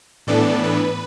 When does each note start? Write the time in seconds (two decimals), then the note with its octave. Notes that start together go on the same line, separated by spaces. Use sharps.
0.27 A2 E3 B3 D4 A4 D5
0.64 B4